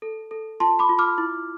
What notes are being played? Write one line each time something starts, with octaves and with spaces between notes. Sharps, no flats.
A4
A4
F4 A5 C6
B5 D6
F4
D6 F6
E4